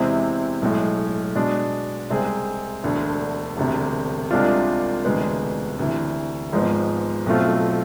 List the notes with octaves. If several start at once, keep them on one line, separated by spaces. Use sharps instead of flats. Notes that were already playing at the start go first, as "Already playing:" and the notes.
Already playing: E2 C3 G#3 C4 E4
B1 A2 G#3
B2 G#3 D4
C2 C3 G#3 C4 G#4
E1 D2 D3
E1 D2 C3
C2 C3 G#3 D4 F4
E1 D2 C3 G#3 B3
D2 C3 E3
G#1 G#2 F3 G#3 B3
B1 B2 A3 C4 F4